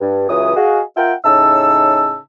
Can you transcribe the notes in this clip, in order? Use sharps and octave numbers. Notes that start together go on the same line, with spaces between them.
G2
C#2 E3 F#3 E4 D#6
F#4 G#4 D#5 F5
F4 A#4 E5 F#5 G5
A2 C#3 D#4 A5 E6